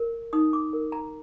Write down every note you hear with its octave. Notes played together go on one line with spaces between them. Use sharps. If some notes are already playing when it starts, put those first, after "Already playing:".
Already playing: A#4
D#4 D#6
D6
A#4
A#5